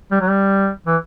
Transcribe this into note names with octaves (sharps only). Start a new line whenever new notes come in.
G3
F#3
G3
E3